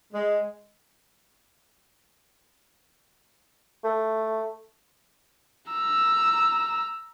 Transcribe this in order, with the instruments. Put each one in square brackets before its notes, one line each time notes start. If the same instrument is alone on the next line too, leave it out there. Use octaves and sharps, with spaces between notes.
[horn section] G#3
[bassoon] A3
[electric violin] A#5 E6